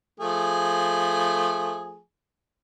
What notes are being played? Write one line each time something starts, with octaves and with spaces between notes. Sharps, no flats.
F3 A3 G#4